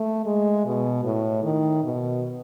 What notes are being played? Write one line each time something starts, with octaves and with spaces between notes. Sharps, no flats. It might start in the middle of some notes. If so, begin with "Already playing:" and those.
Already playing: A3
G#3
B2
A2
D#3
B2